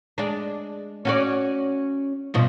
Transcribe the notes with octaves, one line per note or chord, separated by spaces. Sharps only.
G#3 D4
C#4 F#4 D5
G2 B2 F3